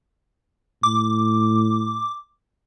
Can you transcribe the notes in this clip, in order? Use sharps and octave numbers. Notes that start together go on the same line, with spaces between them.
A2 D6